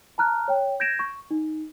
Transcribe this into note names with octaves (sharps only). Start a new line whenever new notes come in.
A5 A#5 F6 F#6
C#5 G5
G6 G#6 A#6 D7 E7
C#6
D#4